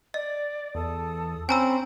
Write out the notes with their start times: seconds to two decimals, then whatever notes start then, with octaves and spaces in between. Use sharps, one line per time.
0.14 D5 D#5
0.75 E2 A4 D#6
1.49 C4 C#4 G#5 A#5 B5 E6